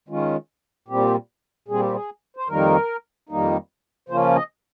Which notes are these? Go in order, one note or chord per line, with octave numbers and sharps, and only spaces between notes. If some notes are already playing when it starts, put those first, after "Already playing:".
D#3 G#3 C#4 F4
A#2 G3 C4 G4
A#2 G3 C4 G#4
G4
G#4
C5
F2 D#3 G3 A#3 D#4 A#4
F2 D#3 G3 A#3 D#4
C#3 F3 A#3 C#4 F4 C5
D#5